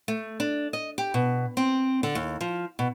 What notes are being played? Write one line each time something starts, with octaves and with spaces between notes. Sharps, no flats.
A3
D4
D#5
G4
B2
C4
D3
D#2
F3
B2